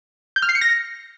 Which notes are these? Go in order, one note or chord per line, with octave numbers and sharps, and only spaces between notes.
G6
F6
C7
C#7
A#6